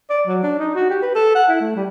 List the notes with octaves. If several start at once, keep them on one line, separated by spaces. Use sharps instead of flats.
D5
F#3
D4
D#4
F#4
G4
B4
A4
F#5
E4
A3
G3